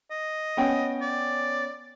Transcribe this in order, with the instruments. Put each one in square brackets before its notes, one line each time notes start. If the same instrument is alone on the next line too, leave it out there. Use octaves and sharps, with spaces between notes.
[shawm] D#5
[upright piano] B3 C#4 G5
[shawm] D5